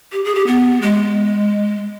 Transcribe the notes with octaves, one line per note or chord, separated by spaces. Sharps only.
G4
G#4
G4
B3
G#3